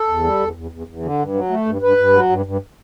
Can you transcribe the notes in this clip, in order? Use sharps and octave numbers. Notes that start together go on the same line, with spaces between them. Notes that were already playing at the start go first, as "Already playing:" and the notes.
Already playing: A4
E2
G3
E2
E2
E2
E2
D3
G2
F#3
A3
G2
G2 B4
G2
F#3
G2
G2